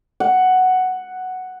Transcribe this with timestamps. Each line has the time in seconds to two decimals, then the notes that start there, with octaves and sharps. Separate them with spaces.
0.20 F#5